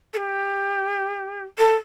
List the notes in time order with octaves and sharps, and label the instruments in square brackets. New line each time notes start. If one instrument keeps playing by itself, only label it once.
[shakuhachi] A4
G4
A4